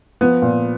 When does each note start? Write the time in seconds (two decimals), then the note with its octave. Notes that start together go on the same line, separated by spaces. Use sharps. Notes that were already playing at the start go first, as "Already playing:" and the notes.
0.21 F3 B3
0.42 A#2